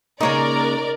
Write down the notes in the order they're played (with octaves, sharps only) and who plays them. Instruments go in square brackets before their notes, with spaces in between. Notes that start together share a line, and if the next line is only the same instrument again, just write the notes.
[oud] C#3 G#3 A#3 [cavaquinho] D#4 C#5 [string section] A#4 D5